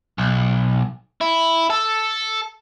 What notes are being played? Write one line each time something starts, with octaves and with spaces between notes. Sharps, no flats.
B1
E4
A4